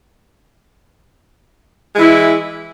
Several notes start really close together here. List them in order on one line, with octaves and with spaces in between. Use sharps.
G#3 E3 E4